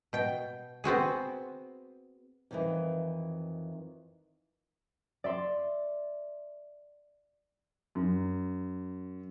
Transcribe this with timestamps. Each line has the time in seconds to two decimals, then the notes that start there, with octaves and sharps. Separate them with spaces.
0.13 B2 G5
0.84 B3 C4 F#4 G#4
2.51 F2 D#3 E3
5.24 D5 E5 C6
7.95 F#2